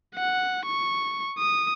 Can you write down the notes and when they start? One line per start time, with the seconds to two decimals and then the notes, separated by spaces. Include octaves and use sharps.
0.15 F#5
0.66 C#6
1.39 D#6